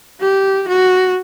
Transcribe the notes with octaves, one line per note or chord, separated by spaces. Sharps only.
G4
F#4